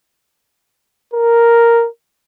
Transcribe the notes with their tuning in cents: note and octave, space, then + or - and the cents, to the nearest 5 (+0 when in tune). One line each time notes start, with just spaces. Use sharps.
A#4 +0